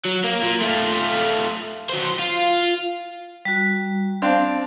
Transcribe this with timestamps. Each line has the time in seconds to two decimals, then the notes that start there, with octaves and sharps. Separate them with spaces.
0.05 F#3
0.24 A#3
0.43 A#2
0.62 A3 F4
1.89 F#3 C5
2.19 F4
3.45 G3 F#4
4.22 C4 D4 F5 G5 A5